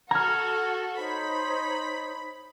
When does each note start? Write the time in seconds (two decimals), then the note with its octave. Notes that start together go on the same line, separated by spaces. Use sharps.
0.11 F#4 A4 A#5 F6 G#6
0.97 D#4 C5 C#5 B5